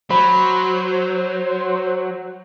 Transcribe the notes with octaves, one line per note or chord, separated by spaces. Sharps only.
F#3 C5 B5